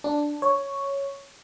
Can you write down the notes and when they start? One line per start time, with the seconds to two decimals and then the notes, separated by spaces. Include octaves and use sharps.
0.04 D4
0.42 C#5